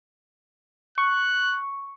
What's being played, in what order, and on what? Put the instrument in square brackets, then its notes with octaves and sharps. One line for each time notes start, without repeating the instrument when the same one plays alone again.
[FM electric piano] C#6 [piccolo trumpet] F#6